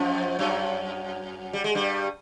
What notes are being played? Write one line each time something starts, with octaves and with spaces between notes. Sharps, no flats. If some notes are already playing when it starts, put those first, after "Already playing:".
Already playing: F2 F3
F#2 F#3
G3
G#3
G2 G3